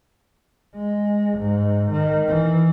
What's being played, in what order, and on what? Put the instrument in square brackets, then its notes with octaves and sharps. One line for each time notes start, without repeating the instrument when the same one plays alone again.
[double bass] G#3
G#2
D#3
E3